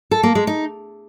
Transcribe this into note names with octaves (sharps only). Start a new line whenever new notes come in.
A4
A#3
G#3
D#4